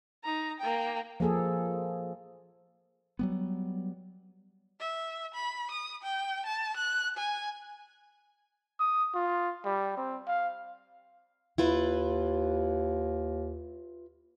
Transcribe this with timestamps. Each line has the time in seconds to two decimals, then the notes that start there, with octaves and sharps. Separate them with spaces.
0.24 D#4 A#5
0.60 A#3 G5
1.20 F3 A#3 G#4 A4
3.19 F#3 G3 B3
4.80 E5
5.34 B5
5.71 D#6
6.03 G5
6.46 A5
6.76 F#6
7.17 G#5
8.80 D#6
9.14 F4
9.65 G3
9.97 C4
10.27 F5
11.58 D#2 E4 F4 B4